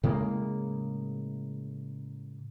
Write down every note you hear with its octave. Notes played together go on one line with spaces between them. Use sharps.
A2 C#3 G#3 A#3